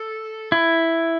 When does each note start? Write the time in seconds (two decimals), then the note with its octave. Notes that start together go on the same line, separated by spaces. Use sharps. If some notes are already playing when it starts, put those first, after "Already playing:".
Already playing: A4
0.52 E4